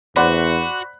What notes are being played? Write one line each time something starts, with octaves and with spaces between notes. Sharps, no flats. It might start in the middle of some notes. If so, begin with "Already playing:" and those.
E2 F#4 C5 D5 F#5 B5 F#6